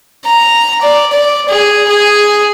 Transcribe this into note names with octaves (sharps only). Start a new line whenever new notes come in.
A#5
D5
D5
G#4
G#4